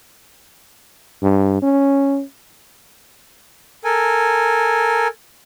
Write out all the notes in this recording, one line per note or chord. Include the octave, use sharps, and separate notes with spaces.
G2
C#4
A4 A#4 G#5